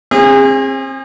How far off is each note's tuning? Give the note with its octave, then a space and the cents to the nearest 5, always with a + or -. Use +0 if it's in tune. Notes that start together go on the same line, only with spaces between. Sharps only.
C4 +35 G#4 -30